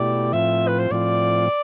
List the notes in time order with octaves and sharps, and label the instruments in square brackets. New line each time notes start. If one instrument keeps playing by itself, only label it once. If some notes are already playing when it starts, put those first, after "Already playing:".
Already playing: [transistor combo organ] B2 A3 E4 G4 [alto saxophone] D5
[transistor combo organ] A2 F3 C4 F4 [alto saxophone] E5
[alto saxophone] B4
C5
[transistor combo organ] A2 F3 C4 F4 [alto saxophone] D5